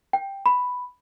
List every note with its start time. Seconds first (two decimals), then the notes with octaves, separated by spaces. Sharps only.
0.13 G5
0.46 B5